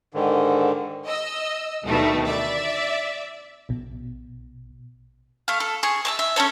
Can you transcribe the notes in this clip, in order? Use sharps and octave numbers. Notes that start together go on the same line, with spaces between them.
G#2 D3 D#3
D#5 E6
D2 B2 D#3 G3 A3
D5 E5
A#1 B2
A3 F5
A4
G#4 C#6
E5 A5 C#6
E5
C#4 F#4 A4 C#5